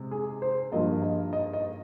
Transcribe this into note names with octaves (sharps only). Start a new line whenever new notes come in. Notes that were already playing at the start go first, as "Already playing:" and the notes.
Already playing: C3 G#3
G#4
C5
G2 F3 A#3 D#5
D#5
D#5
D#5